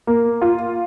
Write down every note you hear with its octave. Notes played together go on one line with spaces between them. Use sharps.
A#3
F4